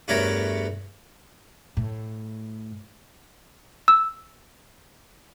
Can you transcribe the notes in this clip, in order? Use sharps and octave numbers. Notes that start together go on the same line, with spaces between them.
E2 G2 A3 F#4 A#4 C#5
A2
E6